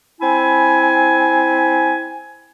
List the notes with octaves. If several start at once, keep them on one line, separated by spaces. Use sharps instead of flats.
C4 E4 G#5